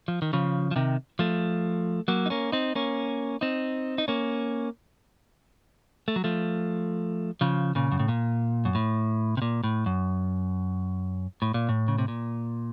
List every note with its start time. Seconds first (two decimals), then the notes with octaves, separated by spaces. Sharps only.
0.08 F3
0.22 D#3
0.33 C#3 F3
0.71 F3
0.76 C3 D#3
1.19 F3 A3
2.08 F#3 A#3
2.26 D#4
2.30 A#3 C#4
2.52 C4 D#4
2.75 A#3 C#4
3.41 C4 D#4
3.98 D#4
4.08 A#3 C#4
6.08 A3
6.16 F#3
6.24 F3 A3
7.41 C#3 F3
7.75 A#2 C#3
7.92 F#2
7.99 A2
8.08 A#2
8.65 F#2
8.75 A2
9.37 C3
9.42 A#2
9.64 A2
9.86 F#2
11.42 A2
11.54 A#2
11.69 A2
11.88 C#3
11.98 C3
12.08 A#2